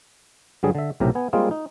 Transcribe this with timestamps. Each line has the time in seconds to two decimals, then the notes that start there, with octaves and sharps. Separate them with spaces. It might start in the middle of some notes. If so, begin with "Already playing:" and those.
0.63 G2 D3 F#3 G3 G#4
0.75 D3 E5
1.00 B1 A2 C3 G4 A#4
1.15 B3 G#5
1.33 G3 G#3 A#3 C4 F4 G#4
1.51 D#4